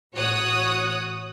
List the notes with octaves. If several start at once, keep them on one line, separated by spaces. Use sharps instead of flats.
A1 F#4 C#5 D#6 F#6